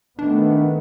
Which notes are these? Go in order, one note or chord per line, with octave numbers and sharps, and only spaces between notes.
D#3 A3 B3 D4